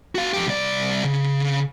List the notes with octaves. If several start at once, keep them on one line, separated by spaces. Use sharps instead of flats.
F#4 F5
F2 G4
C2 D5
C#3